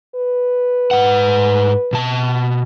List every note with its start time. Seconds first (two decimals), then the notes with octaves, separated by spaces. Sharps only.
0.15 B4
0.91 G#2 F#5
1.93 B2 A5